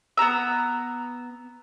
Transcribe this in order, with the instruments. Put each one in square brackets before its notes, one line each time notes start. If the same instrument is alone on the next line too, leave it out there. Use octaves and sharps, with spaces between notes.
[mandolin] B3 F#4 A#5 E6